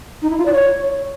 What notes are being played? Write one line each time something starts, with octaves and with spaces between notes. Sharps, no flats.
D#4
E4
F4
D5
C#5